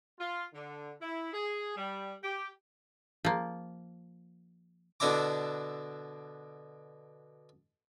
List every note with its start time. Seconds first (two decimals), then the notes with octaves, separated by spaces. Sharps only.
0.19 F4
0.53 D3
1.01 E4
1.32 G#4
1.76 G3
2.22 G4
3.25 F3 A#3
5.00 B2 D3 D4 E4 A#5 D6